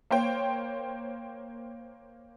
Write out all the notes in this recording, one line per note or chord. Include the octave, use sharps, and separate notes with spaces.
A#3 C5 C#5 G5